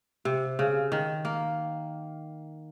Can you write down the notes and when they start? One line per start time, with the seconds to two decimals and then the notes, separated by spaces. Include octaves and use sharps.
0.25 C3
0.59 C#3
0.92 D#3
1.25 A#3